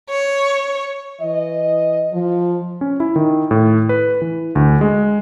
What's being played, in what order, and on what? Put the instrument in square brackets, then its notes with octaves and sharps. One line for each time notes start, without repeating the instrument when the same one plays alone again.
[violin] C#5
[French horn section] E3 D#5
F3
[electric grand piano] C#4
E4
D#3
A2
B4
E3
D2
G#3